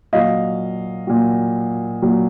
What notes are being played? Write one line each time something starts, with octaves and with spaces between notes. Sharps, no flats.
A#2 F#3 D#5 F5
A#2 F#3
A#2 F#3